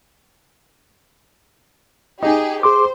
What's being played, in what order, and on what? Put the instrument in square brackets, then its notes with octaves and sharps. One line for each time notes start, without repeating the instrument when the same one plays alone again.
[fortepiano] D#4 [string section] G4 G#4
[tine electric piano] G#4 C6 D6 [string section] C5